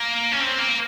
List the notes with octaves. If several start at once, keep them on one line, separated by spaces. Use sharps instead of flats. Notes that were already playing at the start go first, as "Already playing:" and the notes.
Already playing: A#3
C#4
C4
A#3